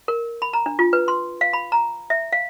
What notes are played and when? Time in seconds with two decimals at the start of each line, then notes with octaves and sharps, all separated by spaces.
0.08 A#4
0.42 B5
0.53 A#5
0.66 D4
0.79 F4
0.93 B4
1.08 C6
1.41 F5
1.53 B5
1.72 A#5
2.10 E5
2.32 F5